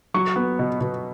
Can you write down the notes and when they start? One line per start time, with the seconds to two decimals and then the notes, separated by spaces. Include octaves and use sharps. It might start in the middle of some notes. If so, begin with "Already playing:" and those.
0.14 F#3 C#6
0.36 B3
0.59 B2
0.81 B2